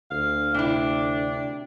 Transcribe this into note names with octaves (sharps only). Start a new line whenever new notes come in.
D2 F5
C3 D4 E4